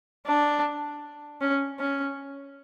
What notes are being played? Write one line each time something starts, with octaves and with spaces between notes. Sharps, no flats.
D4
C#4
C#4